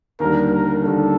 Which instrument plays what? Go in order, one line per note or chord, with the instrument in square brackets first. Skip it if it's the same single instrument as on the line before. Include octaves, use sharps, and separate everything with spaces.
[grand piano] D#2 D3 G3 [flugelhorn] A#4
[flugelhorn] A#4
[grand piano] D#2 D3 G3 [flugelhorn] A4